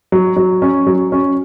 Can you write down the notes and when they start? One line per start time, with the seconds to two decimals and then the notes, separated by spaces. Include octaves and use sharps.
0.12 F#3
0.37 F#3
0.62 C#4
0.87 F#3
1.12 C#4